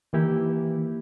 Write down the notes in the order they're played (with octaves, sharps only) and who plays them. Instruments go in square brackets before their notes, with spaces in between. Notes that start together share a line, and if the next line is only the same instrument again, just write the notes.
[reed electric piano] D#3 A#3 E4 G4 [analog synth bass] E3